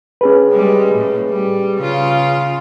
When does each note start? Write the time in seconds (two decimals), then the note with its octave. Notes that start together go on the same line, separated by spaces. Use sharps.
0.21 C#4 G#4 B4
0.52 G3 G#3
0.94 A2
1.29 G3
1.78 C#3 F4